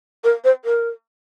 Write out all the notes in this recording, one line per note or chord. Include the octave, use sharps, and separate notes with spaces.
A#4
C5
A#4